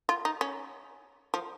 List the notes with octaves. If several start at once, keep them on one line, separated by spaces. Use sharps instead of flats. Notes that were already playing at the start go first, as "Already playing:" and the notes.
F4
D#4
C#4
F3